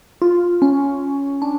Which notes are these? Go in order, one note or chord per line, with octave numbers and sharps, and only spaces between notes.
F4
C#4
D4